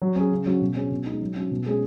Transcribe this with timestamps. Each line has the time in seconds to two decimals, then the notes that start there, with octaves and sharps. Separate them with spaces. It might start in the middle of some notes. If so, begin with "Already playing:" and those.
0.02 F#3
0.16 C#4 G#4
0.31 C#3
0.46 F#3 C#4 F#4
0.62 B2
0.76 F#3 C#4 G#4
0.91 B2
1.06 G#3 D#4
1.21 F#3
1.36 C#4 F#4
1.51 B2
1.66 G#3 C#4 G#4